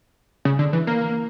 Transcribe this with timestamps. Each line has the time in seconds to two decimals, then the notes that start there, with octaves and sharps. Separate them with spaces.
0.45 C#3
0.59 D3
0.73 E3
0.87 A#3